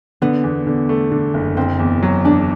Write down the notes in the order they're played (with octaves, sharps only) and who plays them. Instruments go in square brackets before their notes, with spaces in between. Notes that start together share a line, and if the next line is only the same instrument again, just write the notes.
[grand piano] D3 [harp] B3
[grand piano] E2
D3
A3
D3
F#1
[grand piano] F#1 [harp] C4
[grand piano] E2
F#3
[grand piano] E2 [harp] D4